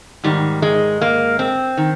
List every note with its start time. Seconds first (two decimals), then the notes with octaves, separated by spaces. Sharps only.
0.24 G#2 D#3 G3
0.62 G#3
1.01 A#3
1.39 C4
1.77 D#3